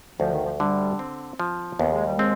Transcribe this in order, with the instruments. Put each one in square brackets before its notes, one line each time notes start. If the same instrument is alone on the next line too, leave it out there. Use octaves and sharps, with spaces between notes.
[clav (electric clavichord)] D2 [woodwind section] F3
[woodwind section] D#3
F3
[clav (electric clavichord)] D3 [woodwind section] G3
[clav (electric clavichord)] C4
F3
[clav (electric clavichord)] D#2 [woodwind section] B3
[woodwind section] G#3
G3
[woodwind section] G#3 [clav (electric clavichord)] C4